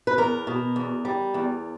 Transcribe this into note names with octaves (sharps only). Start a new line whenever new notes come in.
B4
E2 A#4
B2
E2
G3
E2